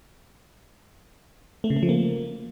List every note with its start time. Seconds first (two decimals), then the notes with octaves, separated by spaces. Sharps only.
1.64 A3
1.70 C#3
1.76 A3
1.83 F3
1.89 A#3